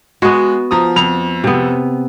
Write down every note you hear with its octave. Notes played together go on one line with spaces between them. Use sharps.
G#3 B3 F#4
F3 A#5 D#6
F2 F7
C3 B3